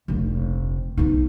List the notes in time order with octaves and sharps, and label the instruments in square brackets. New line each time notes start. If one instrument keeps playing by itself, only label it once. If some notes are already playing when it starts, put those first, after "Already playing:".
[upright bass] F1 A#1
B1 D#4